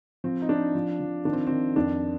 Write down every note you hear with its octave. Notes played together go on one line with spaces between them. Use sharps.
F3 C4
D#4
F3 D4
F3
F3
D#3 D4
C4
D#3 C4
F2 D4